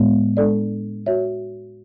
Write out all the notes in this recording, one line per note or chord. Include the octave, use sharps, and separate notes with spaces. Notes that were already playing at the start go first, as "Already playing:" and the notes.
Already playing: A2 G#3 B3
G#3 D4 A4 D5
F#4 C#5 E5